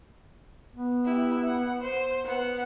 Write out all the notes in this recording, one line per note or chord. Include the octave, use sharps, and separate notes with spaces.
B3
E4 G4
F#5
C5
B3 F#5